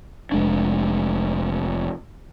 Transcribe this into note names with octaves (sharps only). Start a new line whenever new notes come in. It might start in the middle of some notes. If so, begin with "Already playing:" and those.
F1 G#3 D4